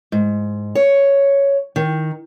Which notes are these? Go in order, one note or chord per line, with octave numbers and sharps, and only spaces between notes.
G#2
C#5
D#3